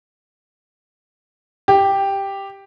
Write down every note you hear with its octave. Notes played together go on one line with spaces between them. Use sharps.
G4